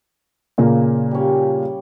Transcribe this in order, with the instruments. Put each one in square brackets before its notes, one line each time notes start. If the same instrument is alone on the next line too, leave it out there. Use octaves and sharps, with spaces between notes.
[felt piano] A#2 C#3 A#3
[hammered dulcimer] G3 C#4